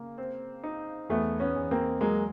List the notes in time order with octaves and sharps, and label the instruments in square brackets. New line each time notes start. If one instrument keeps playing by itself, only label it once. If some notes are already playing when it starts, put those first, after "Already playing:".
Already playing: [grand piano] C#3 A#3
C4
D#4
[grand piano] E2 [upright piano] A3 B3
[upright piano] B3 C#4
[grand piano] E2
[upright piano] A#3 C4
[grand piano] F#3 [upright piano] G#3 A#3